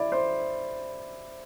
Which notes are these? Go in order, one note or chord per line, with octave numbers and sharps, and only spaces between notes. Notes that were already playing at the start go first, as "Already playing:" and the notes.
Already playing: E4 D5
C5